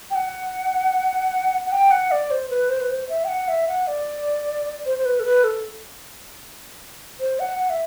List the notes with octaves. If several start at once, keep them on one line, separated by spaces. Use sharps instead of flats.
G5
F#5
F#5
G5
F#5
D5
C5
B4
C5
B4
C5
E5
G5
F#5
E5
F#5
D5
C5
C5
B4
A4
B4
A4
C5
F#5
F#5
E5